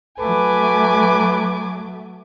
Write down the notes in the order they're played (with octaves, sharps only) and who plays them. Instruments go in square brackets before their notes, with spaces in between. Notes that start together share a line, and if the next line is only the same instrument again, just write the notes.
[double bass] F#3 A3 [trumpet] B4 [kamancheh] G#5 D6